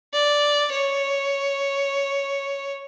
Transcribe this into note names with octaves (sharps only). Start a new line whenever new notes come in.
D5
C#5